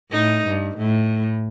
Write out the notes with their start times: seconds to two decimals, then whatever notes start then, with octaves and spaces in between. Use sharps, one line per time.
0.11 A2 D#4
0.48 G2
0.78 A2